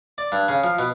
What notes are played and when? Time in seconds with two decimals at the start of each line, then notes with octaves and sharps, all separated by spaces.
0.18 D5
0.32 G2
0.48 C#3
0.64 F3
0.79 B2